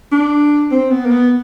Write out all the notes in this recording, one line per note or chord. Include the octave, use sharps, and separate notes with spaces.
D4
C4
B3
A#3
B3